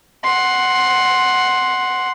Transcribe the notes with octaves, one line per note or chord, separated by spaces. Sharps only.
F#5 C6